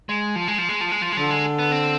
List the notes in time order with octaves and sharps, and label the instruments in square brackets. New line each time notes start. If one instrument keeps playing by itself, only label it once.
[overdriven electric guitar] G#3
F3
G#3
F3
G#3
F3
G#3
F3
G#3
[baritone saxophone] D3 [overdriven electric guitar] F3
[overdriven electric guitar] G#3
B3
C4